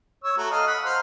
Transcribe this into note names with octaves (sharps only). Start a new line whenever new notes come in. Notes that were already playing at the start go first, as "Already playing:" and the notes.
C#5 E6
A3 F#4 A#5
A4 D#5 F5
F#5 B5
C5 F5 A#5